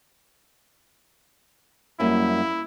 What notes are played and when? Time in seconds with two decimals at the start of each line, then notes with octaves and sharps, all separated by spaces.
2.00 F#2 G3 A#3 E4